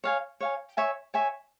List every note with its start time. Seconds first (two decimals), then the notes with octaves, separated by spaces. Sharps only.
0.04 C#5 F5 G#5
0.40 C#5 F5 G#5
0.77 C#5 E5 G#5 C#6
1.14 C#5 E5 G#5 C#6